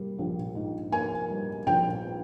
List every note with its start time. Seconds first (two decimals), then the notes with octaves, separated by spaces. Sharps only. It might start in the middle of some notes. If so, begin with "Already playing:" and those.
Already playing: G3 A#3
0.19 A#1
0.55 G#2
0.92 A#3 G#5
1.30 G3
1.66 A#1 G5